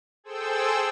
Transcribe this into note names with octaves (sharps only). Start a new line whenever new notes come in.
G#4 A4 C5 G5 E6